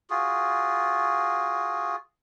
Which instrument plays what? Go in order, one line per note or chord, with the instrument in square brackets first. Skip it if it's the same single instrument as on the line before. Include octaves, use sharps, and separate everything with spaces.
[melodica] F4 F#4 G#4